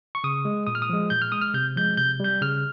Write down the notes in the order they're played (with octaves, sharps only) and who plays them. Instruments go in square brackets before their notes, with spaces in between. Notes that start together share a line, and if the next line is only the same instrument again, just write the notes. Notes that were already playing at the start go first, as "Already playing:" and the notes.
[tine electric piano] C#6
C#3 D#6
G#3
A#2 D#6
F6
D#6
F3 G#3
A#2 G6
F6
G#3 D#6
F6
C3 G6
F3 G#3 G6
C3 G6
G3 G6
C#3 F6